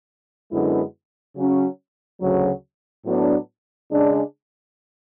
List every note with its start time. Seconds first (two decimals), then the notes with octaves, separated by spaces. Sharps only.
0.52 F#2 D3 G#3 B3 E4
1.36 C#3 F#3 C#4
2.21 D2 C#3 F#3
3.06 A2 F#3 B3 D4
3.90 C#3 G#3 D4